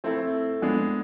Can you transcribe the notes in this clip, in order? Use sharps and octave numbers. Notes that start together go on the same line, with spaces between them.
A3 C4 E4 A4 C5
G#3 B3 D4